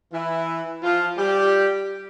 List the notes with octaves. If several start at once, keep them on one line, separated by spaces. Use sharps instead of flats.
E3 E4
F3 F4
G3 G4